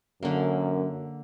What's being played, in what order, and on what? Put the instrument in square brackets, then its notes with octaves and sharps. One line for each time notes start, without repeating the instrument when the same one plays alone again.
[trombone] F#2 [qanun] D3 A#3